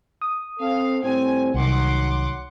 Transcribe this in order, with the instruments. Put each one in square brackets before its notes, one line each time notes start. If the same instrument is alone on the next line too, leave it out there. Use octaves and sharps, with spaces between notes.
[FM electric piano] D#6
[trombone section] C4 A4 [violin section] F5
[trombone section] A2 G3 C4 [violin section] G#5
[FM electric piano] C2 [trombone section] D#3 F#3 [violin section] F#5 C6 D6